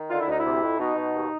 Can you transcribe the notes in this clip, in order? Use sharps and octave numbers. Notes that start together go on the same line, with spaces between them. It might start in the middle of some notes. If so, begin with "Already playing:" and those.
Already playing: D#3
D3 F4
E4
D2 D#4
E4
C3
F2
B2 D#4
B2
D#2